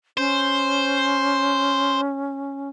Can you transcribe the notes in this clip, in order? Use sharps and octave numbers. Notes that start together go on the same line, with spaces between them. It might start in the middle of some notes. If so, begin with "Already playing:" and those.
C#4 C5